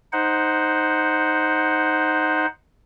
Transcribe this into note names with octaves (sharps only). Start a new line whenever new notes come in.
D#4 C5 F#5